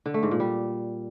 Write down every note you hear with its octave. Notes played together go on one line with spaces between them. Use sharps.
D3
A3
G#2
A#2
G3